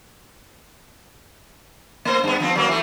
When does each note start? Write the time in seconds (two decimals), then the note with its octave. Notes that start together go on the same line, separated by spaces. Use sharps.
2.05 A3 C5
2.24 G2 B3
2.40 F3 B3 C4
2.55 F#3 A#3 B3
2.69 E3 A3